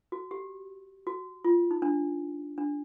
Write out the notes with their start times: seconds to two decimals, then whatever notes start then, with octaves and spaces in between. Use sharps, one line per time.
0.12 F#4
0.31 G4
1.07 F#4
1.44 F4
1.71 D#4
1.82 D4
2.58 D4